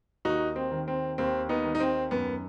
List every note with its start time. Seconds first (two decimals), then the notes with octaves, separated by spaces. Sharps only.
0.25 D#2 D#4 F#4
0.56 C4
0.72 D#3
0.88 C4
1.18 D#2 C4
1.49 B3 D#4
1.64 D#3
1.75 D#4
1.80 C4
2.11 F#2 B3